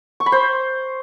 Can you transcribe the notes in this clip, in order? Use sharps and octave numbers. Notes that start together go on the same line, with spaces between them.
C#6
B5
C5